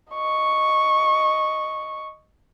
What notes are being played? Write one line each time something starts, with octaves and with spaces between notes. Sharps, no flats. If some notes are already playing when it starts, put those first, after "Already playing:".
D#5 C#6